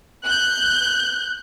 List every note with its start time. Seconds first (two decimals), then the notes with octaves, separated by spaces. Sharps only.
0.25 F#6 G6